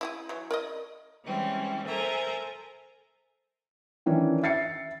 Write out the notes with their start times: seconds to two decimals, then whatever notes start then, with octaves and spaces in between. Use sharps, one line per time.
0.01 E4 F#4 G#4
0.29 E3 F#3
0.51 A#4 D5 D#5
1.24 E3 G3 G#3 C4 C#4
1.85 A4 A#4 C5 E5 G#5 A#5
4.06 D#3 E3 C#4 D4
4.43 E5 A6 C7 C#7